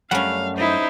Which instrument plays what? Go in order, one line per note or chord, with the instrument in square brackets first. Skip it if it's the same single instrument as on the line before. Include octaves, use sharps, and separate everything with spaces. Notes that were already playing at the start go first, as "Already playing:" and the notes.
[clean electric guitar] F#2 A3 F#5 [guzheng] G3 C#4 [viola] F5
[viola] D#4 C5 [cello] E4